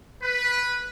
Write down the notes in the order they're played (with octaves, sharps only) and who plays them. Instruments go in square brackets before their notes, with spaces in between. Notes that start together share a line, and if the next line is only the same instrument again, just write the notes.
[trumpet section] B4